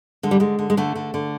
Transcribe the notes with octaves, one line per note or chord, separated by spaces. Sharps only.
D3 G#3
G3
D3 G#3
D3
G#3
D3 A3
D3
D3